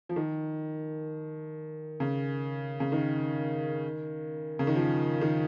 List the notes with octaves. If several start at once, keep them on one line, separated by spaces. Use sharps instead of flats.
F3
D#3
C#3
C#3
D#3
C#3
D#3
F3
D#3